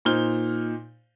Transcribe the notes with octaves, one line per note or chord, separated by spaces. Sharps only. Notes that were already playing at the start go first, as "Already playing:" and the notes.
A#2 D#4 C5 F6 G7